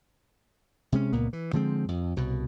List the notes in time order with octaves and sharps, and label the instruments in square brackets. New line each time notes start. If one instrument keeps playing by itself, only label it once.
[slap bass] C3 G#3 C#4
C#2 A#2 A#3 B3
E3
D3 F3 G#3 C4
F2
C2 B2